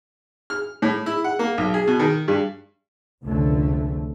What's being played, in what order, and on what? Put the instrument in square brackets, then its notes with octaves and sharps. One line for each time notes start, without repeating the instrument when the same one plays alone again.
[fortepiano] F6
A2
E4
F#5
A#3
B1
G#4
B2
D#3
G2
[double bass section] F1 C#2 D3 A3